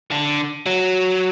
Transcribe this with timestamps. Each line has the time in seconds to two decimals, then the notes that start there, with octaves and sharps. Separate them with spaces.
0.11 D3
0.66 F#3